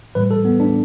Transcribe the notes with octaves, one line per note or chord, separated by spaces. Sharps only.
A2 E3 G3 B4
A4
B3
D4